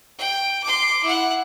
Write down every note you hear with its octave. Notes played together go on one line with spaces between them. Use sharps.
G5
C6 D6
E4 F#5